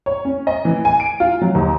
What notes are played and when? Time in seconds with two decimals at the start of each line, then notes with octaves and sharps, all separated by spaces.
0.06 C#5
0.25 C#4
0.47 D#5
0.65 E3
0.85 G#5
1.00 D7
1.20 F4
1.41 F#3
1.55 D#2